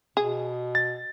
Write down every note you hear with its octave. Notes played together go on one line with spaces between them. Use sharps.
B2 G#4
A6